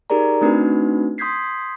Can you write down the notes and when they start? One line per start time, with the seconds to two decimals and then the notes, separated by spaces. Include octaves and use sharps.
0.10 D#4 G4 G#4 A#4 D5 A#5
0.41 A3 C4 D4 D#4 F#4 B4
1.18 C6 D#6 G6 G#6 B6 C7